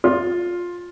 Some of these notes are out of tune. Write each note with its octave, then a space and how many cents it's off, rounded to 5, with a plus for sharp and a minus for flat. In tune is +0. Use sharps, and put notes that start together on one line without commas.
F4 +10